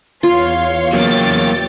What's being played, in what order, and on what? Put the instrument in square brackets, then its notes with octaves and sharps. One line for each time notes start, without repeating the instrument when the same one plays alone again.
[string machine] E2 C#5 [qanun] F4 [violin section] F5 C6
[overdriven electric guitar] F#3 A#3 [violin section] G5 A6